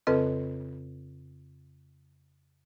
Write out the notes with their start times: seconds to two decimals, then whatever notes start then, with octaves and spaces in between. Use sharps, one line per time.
0.07 F2 C#3 C4 A4 B4 D#5